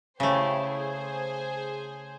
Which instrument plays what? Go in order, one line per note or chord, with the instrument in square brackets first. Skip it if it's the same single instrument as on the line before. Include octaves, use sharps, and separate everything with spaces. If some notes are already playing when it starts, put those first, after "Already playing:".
[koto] C#3 A3 [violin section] E4 G4 C5
[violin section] G#4 C5